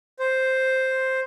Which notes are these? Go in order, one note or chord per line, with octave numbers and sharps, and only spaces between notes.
C5